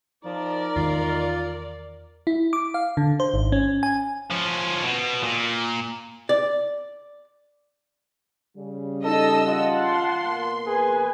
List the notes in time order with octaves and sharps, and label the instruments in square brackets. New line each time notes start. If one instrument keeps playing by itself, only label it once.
[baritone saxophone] F3 [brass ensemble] D#4 A#5 [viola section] A#4 D5
[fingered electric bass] E2 D#3 G#3 [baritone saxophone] F4
[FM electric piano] E4
D6
F5
D3
C5
G#1
C#4
G#5
[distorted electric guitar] F3 C#4
B2
A#2
[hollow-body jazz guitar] D5
[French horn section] C#3 G3
[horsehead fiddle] D#4 [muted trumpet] A4 [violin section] D#5 E6
[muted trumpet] F4 [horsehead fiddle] F#5 A5
[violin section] C6
[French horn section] B2 A#3 A#4
[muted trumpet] G#4 [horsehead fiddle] B4 G#5